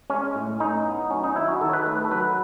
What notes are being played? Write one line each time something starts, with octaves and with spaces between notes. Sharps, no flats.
G#3 C#4
A2
A2 D#4
B3
F#3 C#4
D#4
D#3 E4
F#4
D#3 A4
C#5
B4
A3 B4
A4
F#3 B4